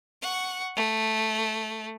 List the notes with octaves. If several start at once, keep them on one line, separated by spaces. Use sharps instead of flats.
F#5 C#6
A3